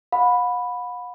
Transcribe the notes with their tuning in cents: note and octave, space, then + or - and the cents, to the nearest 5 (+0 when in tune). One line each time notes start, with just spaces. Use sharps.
F#5 -45 B5 +0